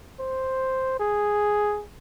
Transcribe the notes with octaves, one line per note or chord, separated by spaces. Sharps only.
C5
G#4